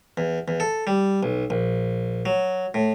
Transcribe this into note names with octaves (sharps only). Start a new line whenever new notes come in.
E2
E2
A4
G3
B1
A#1
F#3
A2